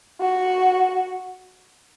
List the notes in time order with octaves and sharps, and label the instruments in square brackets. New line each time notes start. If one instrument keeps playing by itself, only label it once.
[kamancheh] F#4